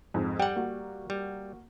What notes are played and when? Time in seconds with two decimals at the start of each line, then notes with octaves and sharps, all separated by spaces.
0.14 F2 G#2
0.40 G3 F#5 G5
0.56 A#3 F#4
1.10 G3